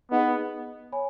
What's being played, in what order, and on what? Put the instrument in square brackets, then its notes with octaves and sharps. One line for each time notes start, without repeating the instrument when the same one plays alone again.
[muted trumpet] B3 [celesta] D#4 G#4 B4 D#5 F#5
[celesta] C#5 G#5 B5